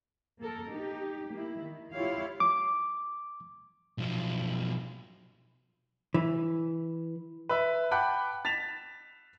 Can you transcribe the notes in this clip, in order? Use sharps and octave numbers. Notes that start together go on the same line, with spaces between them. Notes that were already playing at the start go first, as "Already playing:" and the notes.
A#3 A4 A#4
D#4 G4
A#3 E4
D#3
E4 F4 G4 C#5 F5
D6
B1 F3
E3
B4 E5
F#5 G5 A5 B5 D6 F#6
A6 B6 E7 F7